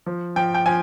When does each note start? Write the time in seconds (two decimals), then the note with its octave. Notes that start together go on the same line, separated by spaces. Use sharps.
0.06 F3
0.36 F3 G5
0.54 G5
0.66 F3 G#5